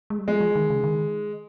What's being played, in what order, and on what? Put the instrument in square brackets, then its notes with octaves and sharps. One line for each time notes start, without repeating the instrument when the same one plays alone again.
[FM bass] G#3
G3
[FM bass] F3 [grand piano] G#3
[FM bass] F3
D#3
C#3
D#3